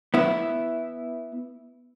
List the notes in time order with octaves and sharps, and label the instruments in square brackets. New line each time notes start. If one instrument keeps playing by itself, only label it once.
[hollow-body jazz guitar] B3 E4